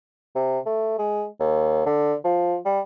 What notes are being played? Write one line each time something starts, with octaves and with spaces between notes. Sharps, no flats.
C3
A3
G#3
D#2
D3
F3
G3